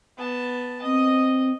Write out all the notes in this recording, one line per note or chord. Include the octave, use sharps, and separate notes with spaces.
B3 A5
C4 D#5